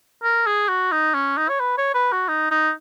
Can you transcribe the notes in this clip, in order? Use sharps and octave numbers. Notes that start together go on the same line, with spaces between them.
A#4
G#4
F#4
D#4
C#4
D#4
C#5
B4
C#5
B4
F#4
D#4
D#4